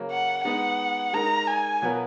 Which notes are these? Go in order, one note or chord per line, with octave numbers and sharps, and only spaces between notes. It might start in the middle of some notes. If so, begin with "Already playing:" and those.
Already playing: C#3 F#3 A#3
F#5
G#3 B3 D#4 F#5
G#3 D#4 A#4 A#5
G#5
B2 F#3 B3 F4 A#4